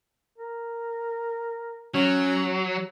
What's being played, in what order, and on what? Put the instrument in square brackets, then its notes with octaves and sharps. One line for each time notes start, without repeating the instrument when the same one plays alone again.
[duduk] A#4
[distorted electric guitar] F#3 [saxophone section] C#4